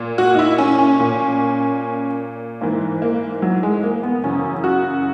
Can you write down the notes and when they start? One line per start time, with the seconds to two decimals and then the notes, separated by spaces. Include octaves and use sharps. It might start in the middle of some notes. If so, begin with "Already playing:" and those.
Already playing: A#2
0.18 F#4
0.35 D#4
0.39 E4
0.58 C#4
0.79 C#4
1.00 A#2
2.61 G#2 E3 A#3
3.02 A#3
3.42 F#3
3.63 G#3
3.83 A#3
4.03 B3
4.23 F#2 C#3 E3 C#4
4.64 F#4